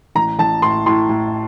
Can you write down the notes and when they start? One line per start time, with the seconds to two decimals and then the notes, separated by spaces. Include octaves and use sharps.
0.15 A1 A#5
0.39 A1 A5
0.62 A2 C6
0.86 A2 C6
1.09 A2